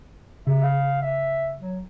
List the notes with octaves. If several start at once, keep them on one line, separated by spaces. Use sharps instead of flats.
C#3 E5
F5
E5
F#3